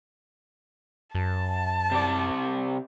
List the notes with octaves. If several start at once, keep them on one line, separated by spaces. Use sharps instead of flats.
F#2 A5
C3 D5